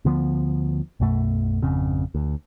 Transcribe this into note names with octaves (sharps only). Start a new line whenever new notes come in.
D2 D3 F3 B3
B1 F#2 B2 A3
G#1 F2 C#3 C4
D2